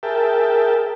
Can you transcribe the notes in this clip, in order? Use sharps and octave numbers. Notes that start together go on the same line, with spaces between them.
G#4 A#4 E5 G5 A5